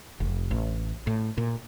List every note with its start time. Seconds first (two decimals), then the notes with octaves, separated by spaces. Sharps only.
0.20 F1
0.51 A1
1.07 A2
1.38 A#2